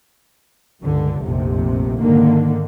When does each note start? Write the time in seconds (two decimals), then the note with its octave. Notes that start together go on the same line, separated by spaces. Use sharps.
0.82 C#2 G2 D3
1.22 F1 A#1 F2 C3
1.99 G#2 D3 D#3 A#3